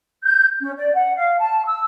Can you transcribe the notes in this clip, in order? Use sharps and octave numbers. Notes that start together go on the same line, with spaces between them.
G6
C#4
D5
F#5
F5
A5
E6